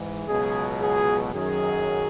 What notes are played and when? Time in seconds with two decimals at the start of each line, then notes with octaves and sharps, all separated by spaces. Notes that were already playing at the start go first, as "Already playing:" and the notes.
Already playing: G#2 E3
0.27 C#2 B2 F#3 G#4
0.80 G#4
1.32 F#2 D#3 F#3 G#4